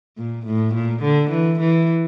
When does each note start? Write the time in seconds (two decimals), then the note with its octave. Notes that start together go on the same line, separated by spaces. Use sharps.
0.18 A#2
0.46 A2
0.75 A#2
1.03 D3
1.31 E3
1.60 E3